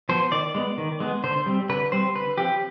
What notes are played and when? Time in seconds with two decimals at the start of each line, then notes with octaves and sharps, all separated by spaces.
0.09 F3 B3 C5
0.32 D#3 D5
0.55 G#3 B3
0.78 D#3
1.00 G#3 B3
1.24 D3 C5
1.46 G3 C4
1.69 D3 B4
1.92 G3 C4 C5
2.15 D3 B4
2.38 F3 C4 G4